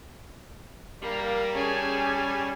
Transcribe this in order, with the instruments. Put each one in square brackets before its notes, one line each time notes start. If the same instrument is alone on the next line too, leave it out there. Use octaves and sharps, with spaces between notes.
[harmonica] G3 [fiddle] A#3
[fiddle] C#4 [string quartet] G#4 G#5 A5